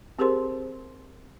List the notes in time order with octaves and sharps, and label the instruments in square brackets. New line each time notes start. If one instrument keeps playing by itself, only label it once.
[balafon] C4 G4 G#4 A#4 C5 C6